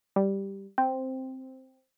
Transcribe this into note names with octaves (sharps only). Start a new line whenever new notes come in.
G3
C4